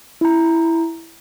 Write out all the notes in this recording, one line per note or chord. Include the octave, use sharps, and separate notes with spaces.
E4 A#5